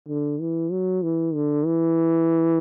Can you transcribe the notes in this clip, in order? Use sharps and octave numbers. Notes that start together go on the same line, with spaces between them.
D3
E3
F#3
E3
D3
E3